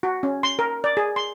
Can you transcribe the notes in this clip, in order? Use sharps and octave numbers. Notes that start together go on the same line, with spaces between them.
F#4
C#4
C6
A#4
D5
G#4
C6